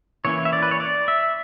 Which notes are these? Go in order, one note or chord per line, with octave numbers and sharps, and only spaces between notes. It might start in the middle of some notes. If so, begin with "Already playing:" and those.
E3 A#3 C#4 E4 C#5
E5
D5
B4
C#5
D5
E5